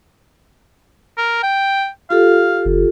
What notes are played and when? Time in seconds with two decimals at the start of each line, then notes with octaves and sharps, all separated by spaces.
1.18 A#4
1.43 G5
2.10 F4 G4 A4 F5
2.65 F#1